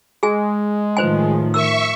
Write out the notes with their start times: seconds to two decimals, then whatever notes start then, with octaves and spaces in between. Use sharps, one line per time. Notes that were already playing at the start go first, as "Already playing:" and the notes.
0.23 G#3 G#4 G#5
0.97 A2 D#3 F3 B4 C5 G#5
1.54 A#4 E5 C#6 E6